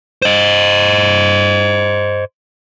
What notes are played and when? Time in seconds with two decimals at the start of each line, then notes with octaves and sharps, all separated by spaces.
0.22 C5 D#5